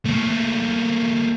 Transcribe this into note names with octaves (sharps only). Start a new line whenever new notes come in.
A3 A#3